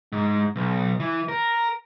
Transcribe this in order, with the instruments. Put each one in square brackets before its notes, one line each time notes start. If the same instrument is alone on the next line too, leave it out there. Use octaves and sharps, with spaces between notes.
[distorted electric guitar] G#2
B1
E3
A#4